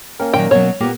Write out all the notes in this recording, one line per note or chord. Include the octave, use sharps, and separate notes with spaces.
A#3 C#4 A#4 G5
A#2 D#3 F#3 G5
B2 F#3 C#5
A#2 A#3 B3 G4